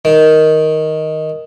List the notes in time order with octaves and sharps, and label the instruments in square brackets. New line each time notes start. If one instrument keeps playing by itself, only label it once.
[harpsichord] D#3